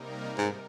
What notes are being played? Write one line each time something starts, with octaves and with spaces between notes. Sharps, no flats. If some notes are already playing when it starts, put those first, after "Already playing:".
Already playing: C3 G3 A#3 D#4 A#4
G#2